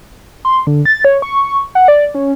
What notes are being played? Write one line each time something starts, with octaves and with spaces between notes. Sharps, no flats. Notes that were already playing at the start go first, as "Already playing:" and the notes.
C6
D3
A6
C#5
C#6
F#5
D5
C#4